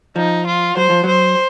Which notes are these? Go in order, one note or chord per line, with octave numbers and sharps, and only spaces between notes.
F3 D#4
F4
F#3 C5
F3
F#3 C5